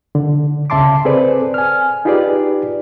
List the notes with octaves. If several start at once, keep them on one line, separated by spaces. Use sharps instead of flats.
D3
C2 C#3 E5 A5 C6 D6
C4 G#4 A4 B4 C5 D5
G#5 F6
D#4 F4 G4 G#4 B4 D5